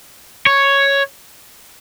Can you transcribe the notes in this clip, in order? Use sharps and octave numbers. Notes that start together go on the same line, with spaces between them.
C#5